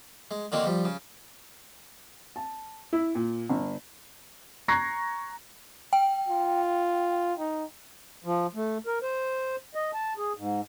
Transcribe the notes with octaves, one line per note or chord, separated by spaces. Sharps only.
G#3
D3 D#3 A#3 C4 F#4
F3 G3
C#3
A5
E4
A#2
G1
A#5 C#6 F#6 G#6 A#6 C7
G5
F4
D#4
F3
A3
A#4
C5
D#5
A5
G#4
G#2